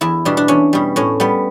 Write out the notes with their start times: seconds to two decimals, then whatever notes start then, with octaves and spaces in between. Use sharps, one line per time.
0.01 E2 E4
0.25 B2 G3 D4
0.37 D4
0.48 E2 C#4
0.73 B2 G3
0.96 A2 C#4
1.20 G3 B3